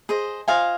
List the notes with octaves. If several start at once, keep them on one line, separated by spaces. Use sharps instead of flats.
G#4 C5 D#5
F4 C5 D#5 F5 G#5